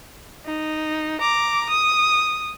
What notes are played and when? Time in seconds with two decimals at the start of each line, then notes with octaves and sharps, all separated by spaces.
0.46 D#4
1.21 A#5 D6
1.70 D#6